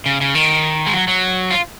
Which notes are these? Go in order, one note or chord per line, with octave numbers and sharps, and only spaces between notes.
C#3
C#3
D#3
G#3
F#3
F#3
F4